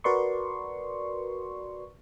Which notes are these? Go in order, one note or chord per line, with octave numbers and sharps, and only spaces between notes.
F#4 A#4 B4 D5 C6 C#6